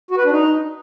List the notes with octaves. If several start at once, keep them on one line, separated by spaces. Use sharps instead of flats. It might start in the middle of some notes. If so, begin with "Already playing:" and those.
F#4
B4
D4
D#4